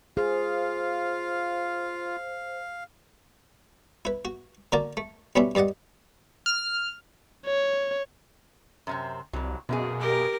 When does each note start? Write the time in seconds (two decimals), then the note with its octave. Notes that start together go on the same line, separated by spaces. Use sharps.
0.17 F4 G#4 C5 F5
4.05 E4 B4
4.25 F#4
4.72 D3 A#3 F#4 A#4 D5 A5
4.97 A3
5.36 B1 G3 B3 C#4 D4 E5
5.55 G2 G3 D5 D#5 F#5
6.46 F6
7.46 C#5
8.87 F#2 C3 C4
9.33 C2 F2 F#3
9.69 F#2 B2 A#3 G#4
10.00 G4 A#4